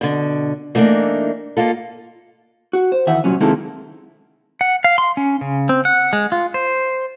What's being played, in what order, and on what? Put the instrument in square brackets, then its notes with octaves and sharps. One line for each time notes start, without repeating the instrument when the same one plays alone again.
[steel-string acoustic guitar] B2 D3
E3 A3 A#3 C4 D4 D#4
A#3 D#4 F4 A4
[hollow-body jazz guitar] F#4
C5
D#3 E3 E5 F#5
C2 A#2 F#3 C#4
C3 D#3 G#3 A#3 E4 A4
[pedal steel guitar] F#5
F5
C6
C#4
C#3
C4
F#5
G#3
F4
C5